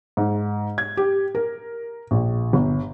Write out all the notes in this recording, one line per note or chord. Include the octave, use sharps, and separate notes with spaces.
G#2
G#6
G4
A#4
A#1
G1